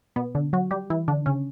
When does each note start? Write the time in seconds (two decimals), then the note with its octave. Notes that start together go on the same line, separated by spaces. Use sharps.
0.16 B2 B3
0.35 D3 D4
0.53 F#3 F#4
0.71 G3 G4
0.90 E3 E4
1.08 D3 D4
1.26 C#3 C#4